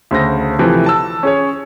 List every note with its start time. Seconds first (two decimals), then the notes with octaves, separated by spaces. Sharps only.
0.11 D2 C#3 C5 A#6
0.59 C3 E3 F3 A3
0.86 A5 E6
1.23 C#4 G#4 C#5